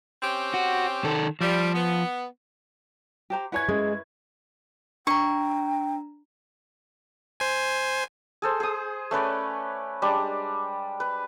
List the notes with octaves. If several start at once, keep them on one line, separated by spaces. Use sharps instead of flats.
C4 C#4 G4
F#4
D#3 A4
F3 G3
B3
G4 C5 A#5
E4 B4 C#5 F#5 G#5 G#6
F#2 G#3
D4 G5 A#5 C#6
C5 G#5
G#4 A4 C5
G#4 D#6
A3 C#4 B4 D5
G3 G#3 D4
B4